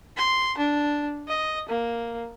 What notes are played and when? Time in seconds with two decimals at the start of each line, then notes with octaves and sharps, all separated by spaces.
0.17 C6
0.57 D4
1.28 D#5
1.68 A#3